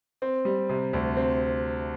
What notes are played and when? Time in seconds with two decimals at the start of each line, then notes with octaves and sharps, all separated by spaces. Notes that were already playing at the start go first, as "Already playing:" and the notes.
0.22 C4
0.45 G3
0.69 C3
0.93 D2
1.17 C4